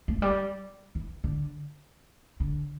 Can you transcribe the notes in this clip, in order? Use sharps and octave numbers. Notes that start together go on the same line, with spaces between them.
A3
F3
G3
E3
D3
D3